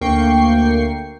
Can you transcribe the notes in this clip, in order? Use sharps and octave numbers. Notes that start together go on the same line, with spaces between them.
D2 A#3 G5 C#6 C7